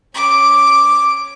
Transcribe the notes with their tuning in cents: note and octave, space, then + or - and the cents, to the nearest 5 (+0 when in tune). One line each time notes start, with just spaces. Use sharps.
C#4 +0 D6 +0